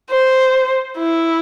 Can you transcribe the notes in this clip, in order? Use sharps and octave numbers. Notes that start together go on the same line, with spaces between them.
C5
E4